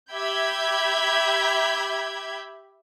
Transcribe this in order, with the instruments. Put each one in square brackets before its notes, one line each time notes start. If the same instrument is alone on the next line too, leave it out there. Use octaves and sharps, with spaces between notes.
[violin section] G4 E5 B5 G6 G#6